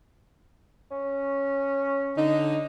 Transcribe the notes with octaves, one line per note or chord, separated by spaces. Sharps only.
C#4
D3 D#4